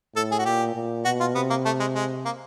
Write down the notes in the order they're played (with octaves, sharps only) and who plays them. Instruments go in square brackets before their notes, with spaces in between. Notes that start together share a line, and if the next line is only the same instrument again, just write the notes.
[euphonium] A2 [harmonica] A4
[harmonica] G#4
F#4
[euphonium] A#2 [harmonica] G4
[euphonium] A#2
[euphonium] B2 [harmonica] F#4
[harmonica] F4
[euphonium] C3 [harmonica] B3
[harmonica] A#3
A3
G#3
G#3
A#3